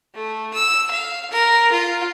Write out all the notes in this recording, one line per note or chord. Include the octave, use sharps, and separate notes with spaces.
A3
E6
F5
A#4
F4